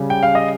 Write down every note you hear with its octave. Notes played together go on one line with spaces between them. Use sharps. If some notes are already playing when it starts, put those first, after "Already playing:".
Already playing: C#3 G3
G5
F5
D#5